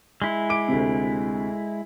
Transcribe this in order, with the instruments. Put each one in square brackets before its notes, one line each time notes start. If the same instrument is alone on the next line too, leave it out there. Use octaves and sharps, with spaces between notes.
[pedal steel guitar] G#3 E4
[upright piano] D6 D7
D2 C3